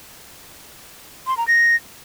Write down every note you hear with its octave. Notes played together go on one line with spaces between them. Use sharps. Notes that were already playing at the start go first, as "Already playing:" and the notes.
C6
A#5
A#6